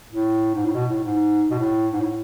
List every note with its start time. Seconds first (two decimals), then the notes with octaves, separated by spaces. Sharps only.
0.12 A2
0.55 G#2
0.65 A2
0.74 B2
0.89 A2
1.03 G#2
1.51 B2
1.58 A2
1.93 G#2
2.01 A2